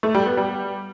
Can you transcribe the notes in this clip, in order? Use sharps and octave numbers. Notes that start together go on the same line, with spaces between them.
A3
G3
B3
G3